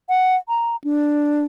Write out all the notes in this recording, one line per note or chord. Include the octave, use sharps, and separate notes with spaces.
F#5
A#5
D4